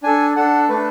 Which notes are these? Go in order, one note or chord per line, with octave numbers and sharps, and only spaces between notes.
D4 A4 G#5
D4 A4 F#5
A3 D4 A4 B4